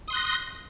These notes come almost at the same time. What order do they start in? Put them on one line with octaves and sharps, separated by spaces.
D#6 C6 F#6 A#6